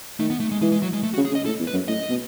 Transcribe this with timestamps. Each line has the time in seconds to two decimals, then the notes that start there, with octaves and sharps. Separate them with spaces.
0.19 D#3 A3
0.30 B3
0.40 A3
0.51 G#3
0.61 E3 G#3
0.72 G#3
0.82 F#3
0.93 G#3
1.03 A3
1.14 F#4
1.17 C#3
1.25 G#4
1.32 C#3
1.35 D#5
1.45 A2 A4
1.60 E2
1.67 B4
1.74 F#2
1.88 A2 D#5
2.09 B2